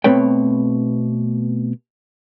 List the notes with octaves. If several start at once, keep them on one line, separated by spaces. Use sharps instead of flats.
B2 A3 C4 B4 C#5 G5